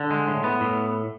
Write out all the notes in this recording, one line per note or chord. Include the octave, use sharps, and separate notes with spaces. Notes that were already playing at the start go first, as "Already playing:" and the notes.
Already playing: D3
G#3
A2
B3
A2